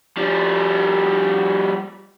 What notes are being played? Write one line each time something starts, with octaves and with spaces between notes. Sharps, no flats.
F3 G3